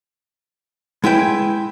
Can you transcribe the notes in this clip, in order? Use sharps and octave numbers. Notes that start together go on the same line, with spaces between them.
G#3 E4 B4 G5